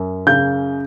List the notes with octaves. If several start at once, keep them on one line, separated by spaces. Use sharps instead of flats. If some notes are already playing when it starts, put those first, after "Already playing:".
Already playing: F#2
C#3 G6